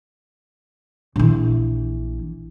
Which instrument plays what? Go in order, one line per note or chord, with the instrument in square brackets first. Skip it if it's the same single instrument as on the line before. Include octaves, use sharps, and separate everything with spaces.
[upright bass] A#1 E3